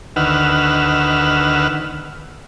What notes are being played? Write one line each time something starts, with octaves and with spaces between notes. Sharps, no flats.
D2 D#3 B4 F#5 E6 F6